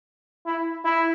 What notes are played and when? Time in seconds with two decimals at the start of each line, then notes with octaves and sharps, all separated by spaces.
0.46 E4
0.85 E4